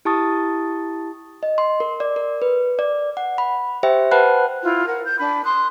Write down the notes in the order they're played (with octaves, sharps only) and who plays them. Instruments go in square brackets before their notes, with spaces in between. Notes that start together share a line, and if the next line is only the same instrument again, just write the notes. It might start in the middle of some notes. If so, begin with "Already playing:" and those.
[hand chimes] E4 G4 A5 C#6 D#6 A6
D#5
C6
A#4
D5
A#4
B4
D5
F#5
B5
G4 C5 E5 G5
B4 C5 F#5 A5 B5 F#6
[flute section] E4 F4
A#4 F#5
G6
D4 B5
C6 D#6 F#6